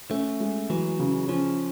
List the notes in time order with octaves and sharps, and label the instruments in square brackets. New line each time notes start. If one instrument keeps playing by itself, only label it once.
[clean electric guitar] A3 [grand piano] C#4
[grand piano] G#3
[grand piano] E3 [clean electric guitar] F#3
[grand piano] C#3
[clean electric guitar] F3 [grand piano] C#4